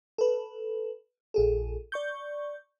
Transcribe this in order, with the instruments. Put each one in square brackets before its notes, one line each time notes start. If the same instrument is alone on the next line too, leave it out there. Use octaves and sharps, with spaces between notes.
[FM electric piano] A4 B4
A#1 G#4 A4
D5 C#6 G6